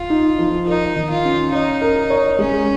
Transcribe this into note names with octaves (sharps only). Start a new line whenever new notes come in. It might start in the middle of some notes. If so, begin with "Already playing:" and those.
Already playing: F4
D#4
F3
D#4 A#4
D#3
F4
C#4
D#4 C#5
A#4
C#5
G#3 C#4